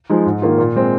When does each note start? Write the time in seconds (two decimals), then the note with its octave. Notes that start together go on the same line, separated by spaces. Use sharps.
0.10 F3 G#3 D#4
0.26 G#2
0.42 D#3 A#3 F4
0.58 A#2
0.76 G#3 C4